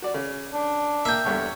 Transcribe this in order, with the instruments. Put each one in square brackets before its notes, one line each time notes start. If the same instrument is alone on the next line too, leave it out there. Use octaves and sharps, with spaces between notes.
[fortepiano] F#4 D5
C#3
[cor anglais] D4
[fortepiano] A#3 [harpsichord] E5 G5
[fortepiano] E2 G2 D3 [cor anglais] C#5